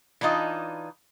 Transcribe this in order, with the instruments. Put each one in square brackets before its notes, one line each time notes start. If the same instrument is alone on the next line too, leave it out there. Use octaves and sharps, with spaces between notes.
[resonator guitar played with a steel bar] E3 D4 D#4 F4 D#5